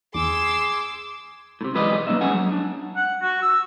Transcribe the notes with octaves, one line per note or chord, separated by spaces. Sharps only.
E2 G#4 C6 D6 E6
A2 C3
B1 E3 G#3 B4 D5 D#5
F#3 A#3 C4 C#4 D#4 E5
G#3 C#4 G#4 F#5 G#5
F#3
D4
F#5
F#4
E6